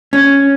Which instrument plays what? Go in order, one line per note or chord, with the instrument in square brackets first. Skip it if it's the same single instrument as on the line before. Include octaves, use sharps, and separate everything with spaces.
[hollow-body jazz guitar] C#4